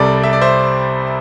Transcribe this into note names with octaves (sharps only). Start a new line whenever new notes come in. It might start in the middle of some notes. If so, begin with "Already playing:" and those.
Already playing: C2 C3 G3 A4 D5
E5
D5
C5 E5